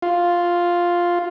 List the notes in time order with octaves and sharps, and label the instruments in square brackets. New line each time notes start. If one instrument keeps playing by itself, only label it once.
[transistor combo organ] F4